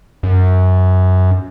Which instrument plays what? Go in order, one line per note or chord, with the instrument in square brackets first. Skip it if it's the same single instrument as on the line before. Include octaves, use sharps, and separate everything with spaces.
[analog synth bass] F#2